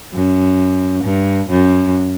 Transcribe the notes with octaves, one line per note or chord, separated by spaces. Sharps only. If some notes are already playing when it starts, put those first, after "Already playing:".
F#2
G2
F#2